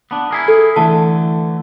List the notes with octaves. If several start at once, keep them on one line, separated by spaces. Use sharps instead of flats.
B3 D4
E4 G#4 A#4
A4
D3 E3 A3 A5